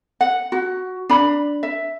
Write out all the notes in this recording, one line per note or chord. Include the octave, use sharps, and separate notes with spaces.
F#5
F#4
D4 B5
E5